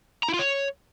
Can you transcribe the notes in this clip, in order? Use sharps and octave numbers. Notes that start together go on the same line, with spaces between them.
A#5
E4
F4
C#5